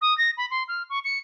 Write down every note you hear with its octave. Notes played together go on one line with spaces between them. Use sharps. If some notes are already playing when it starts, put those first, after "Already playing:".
D#6
A#6
B5
C6
F6
C#6
C#7